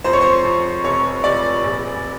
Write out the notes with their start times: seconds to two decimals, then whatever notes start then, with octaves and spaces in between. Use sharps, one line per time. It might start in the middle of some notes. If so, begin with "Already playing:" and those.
0.04 F2 C5
0.13 C#5
0.21 C5
0.45 F2
0.84 F1 C#5
1.24 F1 D5
1.64 A#1